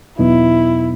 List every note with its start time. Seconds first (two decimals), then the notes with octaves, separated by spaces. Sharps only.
0.19 E2 B2 F#3 B3 D#4 E4